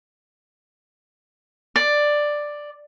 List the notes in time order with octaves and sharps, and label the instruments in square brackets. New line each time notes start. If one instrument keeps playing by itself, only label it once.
[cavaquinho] D5